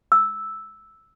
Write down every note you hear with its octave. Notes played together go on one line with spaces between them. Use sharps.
E6